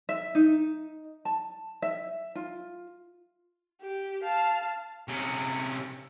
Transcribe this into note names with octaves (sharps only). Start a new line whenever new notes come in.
E5
D#4
A5
E5
F4
G4
F5 A5
C3 C#4